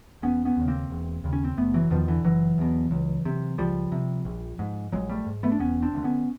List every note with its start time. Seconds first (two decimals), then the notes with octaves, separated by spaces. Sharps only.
0.22 E1 B3 C#4
0.45 B3 C#4
0.57 D#2 C#3
0.68 A#3 C4
0.90 E1
1.24 D#2 C#3
1.33 C#4
1.45 C4
1.57 F#1 A3 B3
1.74 E3 F#3
1.90 E2 B2 D#3 F3
2.08 D3 E3
2.24 F#1 E3 F#3
2.58 E2 B2
2.91 C#2
3.25 C3
3.58 C#2 F3 G3
3.92 C3
4.25 A#1
4.59 G#2
4.92 A#1 F#3 G#3
5.09 G3 A3
5.26 G#2
5.43 A3 B3
5.52 D4
5.59 E1 B3 C#4
5.82 C4 D4
5.94 D2 D3
6.04 B3 C#4